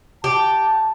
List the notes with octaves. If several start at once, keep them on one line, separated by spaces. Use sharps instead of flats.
G4 A5